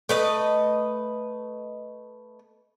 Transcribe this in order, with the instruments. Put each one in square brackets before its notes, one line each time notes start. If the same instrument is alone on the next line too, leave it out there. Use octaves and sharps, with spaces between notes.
[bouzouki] A3 B4 D#5